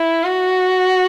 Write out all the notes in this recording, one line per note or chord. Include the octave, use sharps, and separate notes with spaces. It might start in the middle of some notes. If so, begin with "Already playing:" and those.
Already playing: E4
F#4